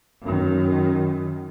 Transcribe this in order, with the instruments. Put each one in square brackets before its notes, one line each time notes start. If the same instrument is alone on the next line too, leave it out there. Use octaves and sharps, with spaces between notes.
[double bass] F#2 D#3